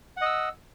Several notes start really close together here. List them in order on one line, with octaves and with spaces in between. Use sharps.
F#5 D#5 E6